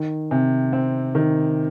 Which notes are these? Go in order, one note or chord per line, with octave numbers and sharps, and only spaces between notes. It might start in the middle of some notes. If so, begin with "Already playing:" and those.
Already playing: D#3
C3
C4
D#3